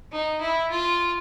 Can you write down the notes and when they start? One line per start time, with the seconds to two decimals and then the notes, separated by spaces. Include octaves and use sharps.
0.12 D#4
0.41 E4
0.70 F4